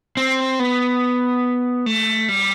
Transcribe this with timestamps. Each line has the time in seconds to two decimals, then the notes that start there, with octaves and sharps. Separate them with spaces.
0.17 C4
0.59 B3
1.86 A3
2.29 G3